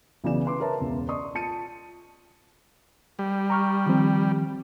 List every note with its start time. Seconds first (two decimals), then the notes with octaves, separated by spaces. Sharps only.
0.24 B1 C#3 E3 F#4 D5 E7
0.45 B4 C6 D6
0.60 A#4 B4 C#5 E5 A5 A#5
0.80 E1 C#2
1.09 D5 D#5 C6 C#6 D#6
1.35 F4 A5 C#7 D#7
3.19 G3
3.50 A#5 C#6 F6
3.86 D#3 F3 C4